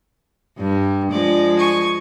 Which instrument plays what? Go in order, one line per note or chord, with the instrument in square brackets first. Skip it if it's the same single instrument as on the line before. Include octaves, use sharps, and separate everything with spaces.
[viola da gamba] G2 G3
[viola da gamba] F3 G#3 [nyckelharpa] D5
[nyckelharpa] G#5 C#6